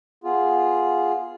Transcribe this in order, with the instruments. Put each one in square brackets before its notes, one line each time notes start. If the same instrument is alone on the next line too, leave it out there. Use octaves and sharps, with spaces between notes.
[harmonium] B3 F4 G#4